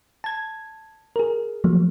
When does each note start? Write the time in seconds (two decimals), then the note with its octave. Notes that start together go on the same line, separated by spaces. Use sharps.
0.24 A5 G#6
1.16 G#4 A#4
1.64 F3 F#3 A3 A#3